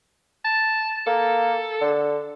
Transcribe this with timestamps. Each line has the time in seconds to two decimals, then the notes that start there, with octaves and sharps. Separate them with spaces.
0.45 A5
1.06 A#3 A4
1.81 D3